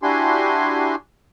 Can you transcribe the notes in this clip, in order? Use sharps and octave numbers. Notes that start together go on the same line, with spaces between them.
D4 E4 F#4 G4 G#5 C6